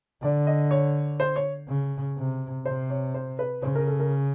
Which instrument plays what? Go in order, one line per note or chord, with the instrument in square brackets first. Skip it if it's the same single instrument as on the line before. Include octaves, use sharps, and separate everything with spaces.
[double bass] D3 [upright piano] D5
[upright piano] D#5
C#5
C5
C#5
[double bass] C#3
C3
[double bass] C3 [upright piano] C5
[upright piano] C#5
C5
B4
[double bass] C#3 [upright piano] C5
[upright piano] A#4
A4
A#4